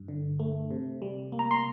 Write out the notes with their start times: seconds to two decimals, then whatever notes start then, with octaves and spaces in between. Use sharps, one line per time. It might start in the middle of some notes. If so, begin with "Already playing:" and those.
Already playing: G2
0.08 D3
0.40 A3
0.71 C3
1.02 G3
1.32 A#3
1.39 A#5
1.51 C6